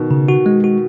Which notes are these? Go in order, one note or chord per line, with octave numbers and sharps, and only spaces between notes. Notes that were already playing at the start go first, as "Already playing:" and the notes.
Already playing: B2 D#3
C#3
F#4
G#3
F#4